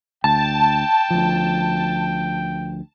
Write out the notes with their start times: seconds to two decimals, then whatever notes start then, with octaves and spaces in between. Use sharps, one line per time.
0.24 D2 G5 A5
1.10 D2 F3